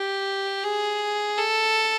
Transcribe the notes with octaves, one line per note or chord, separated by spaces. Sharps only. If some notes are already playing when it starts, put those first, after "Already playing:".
Already playing: G4
G#4
A4